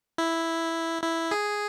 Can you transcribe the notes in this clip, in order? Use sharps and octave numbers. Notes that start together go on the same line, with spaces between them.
E4
E4
G#4